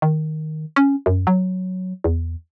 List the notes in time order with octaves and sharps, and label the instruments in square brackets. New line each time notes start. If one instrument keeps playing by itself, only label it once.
[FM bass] D#3
C#4
F#2
F#3
E2